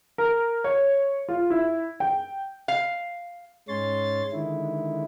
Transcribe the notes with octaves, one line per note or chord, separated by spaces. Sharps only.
A#4
C#5
F4
E4
G5
F5
G#2 G#3 C#4 C#5 C6 A6
D3 D#3 G#3 E4